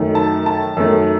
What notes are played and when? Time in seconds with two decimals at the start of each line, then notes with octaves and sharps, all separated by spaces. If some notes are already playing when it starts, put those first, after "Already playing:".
Already playing: F#2 D#3 A3
0.15 A5
0.46 A5
0.77 F#2 D#3 A3